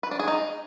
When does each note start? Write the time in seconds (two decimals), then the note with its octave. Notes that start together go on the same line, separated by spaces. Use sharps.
0.03 B4
0.11 D4
0.19 G#4
0.28 D#4